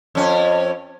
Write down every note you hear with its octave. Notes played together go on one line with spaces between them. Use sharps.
F2 C#4